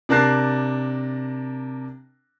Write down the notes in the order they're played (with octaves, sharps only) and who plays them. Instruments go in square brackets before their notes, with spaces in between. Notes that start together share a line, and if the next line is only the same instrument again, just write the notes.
[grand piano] C3 D4 A#4 A5 F#6 C7